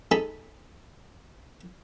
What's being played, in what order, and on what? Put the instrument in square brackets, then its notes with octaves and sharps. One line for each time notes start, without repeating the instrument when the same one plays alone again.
[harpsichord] D#4 G#4 A4 A5 B5